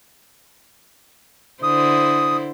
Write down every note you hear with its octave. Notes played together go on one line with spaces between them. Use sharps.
D3 E4 C5 D#6